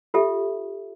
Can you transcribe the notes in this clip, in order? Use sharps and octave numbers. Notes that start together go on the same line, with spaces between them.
F4 G4 A4 E5